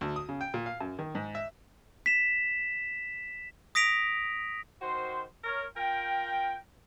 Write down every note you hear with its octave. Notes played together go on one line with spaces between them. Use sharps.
D2
D#6
C#3
G5
A#2
F5
F#2
D#3
G#2
E5
B6 E7
D#6 A#6 B6 D7 F7
D#3 F#4 C5
A#4 C#5
F4 A#4 G5